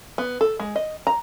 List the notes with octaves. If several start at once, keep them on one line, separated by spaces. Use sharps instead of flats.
B3
A4
G#3
D#5
A#5